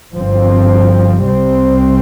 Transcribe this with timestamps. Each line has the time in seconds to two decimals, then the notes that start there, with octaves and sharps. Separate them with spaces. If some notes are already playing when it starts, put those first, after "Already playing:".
0.14 G1 G2 F3 C4
1.25 C2 C3 G3 C4